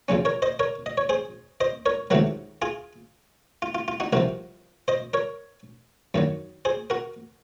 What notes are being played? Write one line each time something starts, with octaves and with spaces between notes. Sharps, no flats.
F2 C#3 F#3 C#4
A#4 C#5
C5 D#5
A#4 C#5
D#5
C#5
G#4 C5
C5 D#5
A#4 C#5
C#2 C3 D#3 F#3 F#4 A#4
F4 G#4
F4
F4
F4
D#4 F#4
C2 C3 F3 F#4 A#4
C5 D#5
A#4 C#5
F#2 D#3 F#3
G#4 C5
F#4 A#4